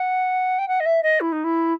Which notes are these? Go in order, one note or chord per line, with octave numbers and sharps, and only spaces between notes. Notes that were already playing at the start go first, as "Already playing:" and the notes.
Already playing: F#5
G5
F#5
D#5
E5
D#5
E4
D#4
E4